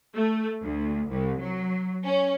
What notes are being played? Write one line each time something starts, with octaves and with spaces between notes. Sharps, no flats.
A3
D2
C2
F#3
C#4